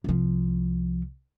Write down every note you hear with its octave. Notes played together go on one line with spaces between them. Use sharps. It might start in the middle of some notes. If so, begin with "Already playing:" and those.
C2 F3